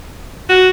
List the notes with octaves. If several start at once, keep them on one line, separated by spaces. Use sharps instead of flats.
F#4